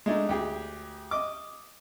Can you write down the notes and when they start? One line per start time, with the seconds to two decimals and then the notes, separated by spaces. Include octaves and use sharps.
0.06 G#3 A3 D4 D#4
0.29 D2 G4 G#4
1.11 D#5 D6